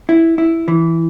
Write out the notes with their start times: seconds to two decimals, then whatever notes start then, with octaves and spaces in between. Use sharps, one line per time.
0.09 E4
0.38 E4
0.68 E3